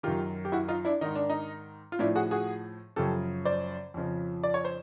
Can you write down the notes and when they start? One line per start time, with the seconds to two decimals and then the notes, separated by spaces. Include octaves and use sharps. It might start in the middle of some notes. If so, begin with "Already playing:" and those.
0.03 F#2 D#3 F4 G4
0.45 G4
0.52 E4 F#4
0.68 D#4 F4
0.85 D4 E4
1.01 G#2 D#3 D#4
1.15 D4
1.29 D#4
1.92 F4
1.99 A2 F3 D4 E4
2.15 F#4 G#4
2.31 F#4 G#4
2.96 F#2 C#3 F3 G4 A4
3.45 C5 D5
3.94 F2 C#3 F3
4.43 D5
4.54 C#5
4.65 C5